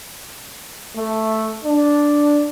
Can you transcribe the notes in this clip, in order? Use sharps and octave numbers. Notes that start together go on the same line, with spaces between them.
A3
D4